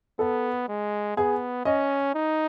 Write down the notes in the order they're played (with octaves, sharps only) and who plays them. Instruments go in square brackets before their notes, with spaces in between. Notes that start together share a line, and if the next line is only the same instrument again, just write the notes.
[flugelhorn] B3 [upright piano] A4
[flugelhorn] G#3
[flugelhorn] B3 [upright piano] G#4
[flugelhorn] C#4 [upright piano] D#5
[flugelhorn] D#4